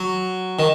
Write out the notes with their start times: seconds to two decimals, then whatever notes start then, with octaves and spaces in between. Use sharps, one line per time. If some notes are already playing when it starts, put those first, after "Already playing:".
Already playing: F#3
0.59 D#3